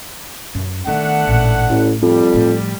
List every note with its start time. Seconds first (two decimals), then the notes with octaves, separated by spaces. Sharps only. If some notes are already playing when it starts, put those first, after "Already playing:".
0.55 F#2
0.87 D#3 A3 B3 D4 F#5
1.27 A1 A#2
1.69 A1 A2
2.02 F2 G3
2.33 A2 F3